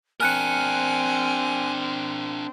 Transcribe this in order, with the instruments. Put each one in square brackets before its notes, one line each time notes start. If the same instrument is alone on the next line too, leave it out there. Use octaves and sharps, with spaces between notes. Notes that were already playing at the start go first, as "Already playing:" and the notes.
[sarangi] C4 [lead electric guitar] D4 A#4 [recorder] G#5 [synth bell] F6 F#6 C#7